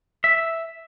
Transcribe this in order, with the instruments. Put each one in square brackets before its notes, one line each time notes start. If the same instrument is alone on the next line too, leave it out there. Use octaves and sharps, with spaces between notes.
[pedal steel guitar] E5